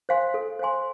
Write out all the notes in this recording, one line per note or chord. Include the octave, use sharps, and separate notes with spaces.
C5 F5 G#5 C6
A4
C5 F5 G#5 C6